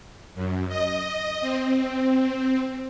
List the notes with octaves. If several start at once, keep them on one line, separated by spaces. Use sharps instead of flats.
F#2
D#5
C4